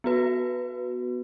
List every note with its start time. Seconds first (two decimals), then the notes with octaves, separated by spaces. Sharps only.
0.04 B3 F#4 B4